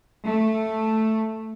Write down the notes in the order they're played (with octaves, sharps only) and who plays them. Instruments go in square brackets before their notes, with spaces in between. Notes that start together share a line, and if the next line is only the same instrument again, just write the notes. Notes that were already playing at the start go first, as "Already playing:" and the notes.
[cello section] A3